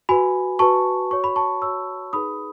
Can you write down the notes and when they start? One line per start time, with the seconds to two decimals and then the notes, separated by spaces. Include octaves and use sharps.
0.09 F#4 B4 G#5 B5
0.59 F#4 B4 A5 C#6
1.11 F#4 C#5 C#6
1.24 B5
1.36 A5 C#6
1.62 F#4 C#5 C#6 E6
2.13 D#4 G#4 B4 B5 D#6